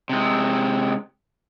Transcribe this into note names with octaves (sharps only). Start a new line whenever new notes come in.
C3 G#3